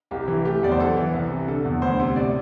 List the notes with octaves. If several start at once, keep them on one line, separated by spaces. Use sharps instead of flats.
C2 G4
E3
A3 G4
E2 D5
C5
E3 A4
E3
C2
C3
D3 A4
E2
D2 C5
C3
A2 D5